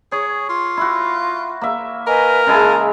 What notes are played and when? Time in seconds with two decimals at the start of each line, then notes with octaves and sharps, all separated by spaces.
0.12 G#4 C#5
0.49 F4
0.77 E4 F#4
1.61 A#3 E5
2.07 A#4 B4 D#5 G#5
2.47 C#3 G#3 E4 G#5 A5